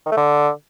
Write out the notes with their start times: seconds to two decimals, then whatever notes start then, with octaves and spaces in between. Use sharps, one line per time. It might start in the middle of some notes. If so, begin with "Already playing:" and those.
0.06 D#3
0.12 A3
0.17 D3